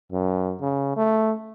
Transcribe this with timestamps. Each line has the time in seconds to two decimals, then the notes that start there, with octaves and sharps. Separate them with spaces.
0.12 F#2
0.61 C#3
0.96 A3